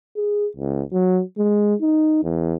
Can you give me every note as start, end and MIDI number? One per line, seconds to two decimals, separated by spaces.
0.17 0.47 68
0.56 0.82 37
0.92 1.21 54
1.38 1.75 56
1.81 2.19 63
2.23 2.54 40